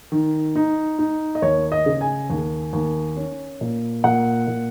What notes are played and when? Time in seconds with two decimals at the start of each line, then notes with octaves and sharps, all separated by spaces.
0.12 D#3
0.56 D#4
0.99 D#4
1.35 D#5
1.42 D#2 C#5
1.72 D#5
1.86 C#3
2.01 G#5
2.30 D#2
2.73 D#2
3.17 C#4
3.61 A#2
4.04 A#2 F#5
4.47 A#2